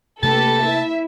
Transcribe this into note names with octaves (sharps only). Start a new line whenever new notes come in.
C3 A3 A#3 D4 G4 A4 B4 A5
E4 E5